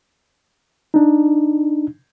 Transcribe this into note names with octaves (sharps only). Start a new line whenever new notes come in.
D4 D#4